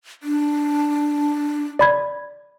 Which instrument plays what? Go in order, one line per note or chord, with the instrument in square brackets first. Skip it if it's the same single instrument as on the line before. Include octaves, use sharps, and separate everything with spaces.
[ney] D4
[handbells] D5 B5 G#6